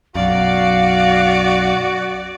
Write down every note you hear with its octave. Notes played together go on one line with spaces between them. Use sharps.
B1 F#2 F#4 D5 F5